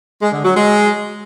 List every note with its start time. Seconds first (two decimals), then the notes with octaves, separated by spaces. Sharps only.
0.21 G#3
0.32 D3
0.43 F#3
0.55 G#3